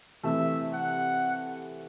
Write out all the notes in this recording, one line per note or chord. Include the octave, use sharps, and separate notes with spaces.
C3 E3 A3 E5
F#5